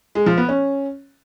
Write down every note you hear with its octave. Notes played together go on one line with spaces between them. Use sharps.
G#3
F3
B3
C#4